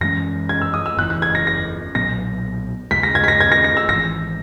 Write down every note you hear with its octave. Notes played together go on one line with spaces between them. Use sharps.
F#2 E3 G#3 C#4 A#6
G#6
E6
D#6
E6
F#1 E2 C#3 E3 F#6
F#6
G#6
A#6
A#6
B1 A#2 F#3 B3 A#6
D#2 C#3 G#3 B6
A#6
G#6
B6
A#6
G#6
A#6
A#6
E6
G#1 G#2 E3 A#6